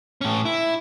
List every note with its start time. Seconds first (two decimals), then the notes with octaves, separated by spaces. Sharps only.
0.21 A2 C#4
0.45 E4